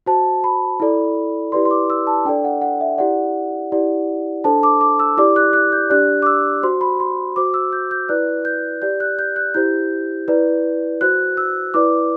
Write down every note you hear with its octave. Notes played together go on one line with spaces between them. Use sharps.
F#4 C5 A5
B5
E4 A4 D5
E4 G4 B4 D5 C6
C6
D6
E6
A5
D4 A4 D5 G5
F#5
F#5
E5
E4 G4 D5 F#5
E4 G4 D5
D4 A4 C5 A5
D6
D6
E6
E4 G4 D5 D6
F#6
F#6
G6
D4 G4 D5 F#6
D6
E6
F#4 C5 C6
B5
C6
F#4 C5 D6
E6
G6
G6
E4 B4 D5 F#6
G6
G4 D5 G6
F#6
G6
F#6
E4 G4 C5 G6
E4 B4 D5
F#4 C5 F#6
E6
E4 B4 D5 D6